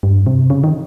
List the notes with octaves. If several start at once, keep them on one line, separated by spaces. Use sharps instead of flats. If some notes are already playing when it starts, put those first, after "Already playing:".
G2
C3
C#3
D#3